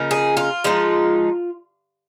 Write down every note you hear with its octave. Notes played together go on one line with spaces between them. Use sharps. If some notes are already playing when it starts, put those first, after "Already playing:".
Already playing: C#3 F3 A#3 D#4
G#4
F4
F3 G#3 D#4